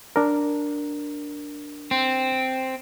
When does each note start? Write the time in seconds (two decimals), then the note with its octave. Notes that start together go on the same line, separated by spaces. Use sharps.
0.16 D4 A#4
1.91 C4